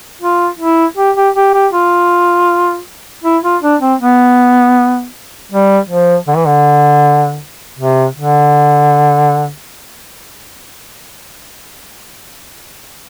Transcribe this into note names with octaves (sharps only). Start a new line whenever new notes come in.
F4
E4
G4
G4
G4
G4
F4
E4
F4
D4
C4
B3
G3
F3
D3
E3
D3
C3
D3